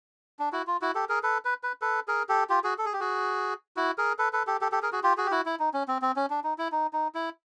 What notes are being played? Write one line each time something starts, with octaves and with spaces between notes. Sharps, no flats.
D4
E4 F#4
F4
E4 F#4
G4 A4
G#4 A#4
A4 B4
B4
B4
A4 B4
G#4 A#4
G4 A4
F4 G4
F#4 G#4
A4
G#4
G4
F#4 G#4
E4 F#4
G#4 A#4
A4 B4
A4 B4
G4 A4
G4 A4
G4 A4
G#4 A#4
F#4 G#4
F4 G4
F#4 G#4
G4
E4 F#4
E4
D#4
C#4
C4
C4
C#4
D4
D#4
E4
D#4
D#4
E4